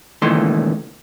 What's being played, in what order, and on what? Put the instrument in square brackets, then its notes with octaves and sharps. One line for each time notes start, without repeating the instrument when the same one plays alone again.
[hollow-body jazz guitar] C#2 A#2 D#3 E3 A3 C6